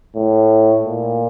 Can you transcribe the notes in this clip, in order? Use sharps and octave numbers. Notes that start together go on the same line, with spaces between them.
A2
A#2